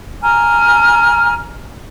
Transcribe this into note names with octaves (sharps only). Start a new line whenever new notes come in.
G#5 A#5 F6